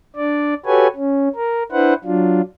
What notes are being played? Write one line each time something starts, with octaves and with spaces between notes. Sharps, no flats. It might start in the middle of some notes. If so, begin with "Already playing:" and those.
D4 D5
F#4 G4 A4 B4 C#5 G#5
C#4
A#4
D4 E4 B4 C5 F#5
F#3 D4 F4